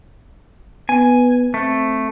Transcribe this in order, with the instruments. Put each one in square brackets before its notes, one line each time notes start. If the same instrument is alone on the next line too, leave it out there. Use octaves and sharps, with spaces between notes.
[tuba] B3 [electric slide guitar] G#5
[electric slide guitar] A3 [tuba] C4